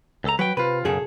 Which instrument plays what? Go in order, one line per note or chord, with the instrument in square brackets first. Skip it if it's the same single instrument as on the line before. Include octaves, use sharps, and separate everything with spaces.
[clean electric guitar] C#2 A4 A#5
[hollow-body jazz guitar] F#3 [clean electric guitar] B4 G5
[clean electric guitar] C3 F4 [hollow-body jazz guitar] B4
[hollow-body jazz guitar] B1 G#4 A4 [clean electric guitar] F#2 C#3